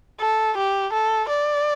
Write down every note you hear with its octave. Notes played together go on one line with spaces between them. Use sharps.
A4
G4
A4
D5